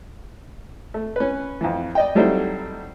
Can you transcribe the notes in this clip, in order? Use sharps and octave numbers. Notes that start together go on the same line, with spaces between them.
A3
C#4 B4
F2 E3
D5 D#5 G5
F#3 G3 A3 C4 D#4 E4